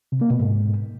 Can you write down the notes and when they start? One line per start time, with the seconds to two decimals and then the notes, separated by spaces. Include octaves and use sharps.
0.12 C3
0.21 A#3
0.30 B2
0.40 G#2